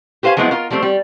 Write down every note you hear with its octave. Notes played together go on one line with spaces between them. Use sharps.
G4 B4 C5 F5 G#5
F3 F#3 G#3 B3 C4 E4
F4 A#4
F3 G3 A3 C4
G3